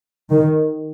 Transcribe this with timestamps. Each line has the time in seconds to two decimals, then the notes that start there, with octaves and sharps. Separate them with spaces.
0.30 D#3